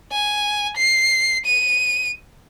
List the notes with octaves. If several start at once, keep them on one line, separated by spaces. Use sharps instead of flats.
G#5
C7
D#7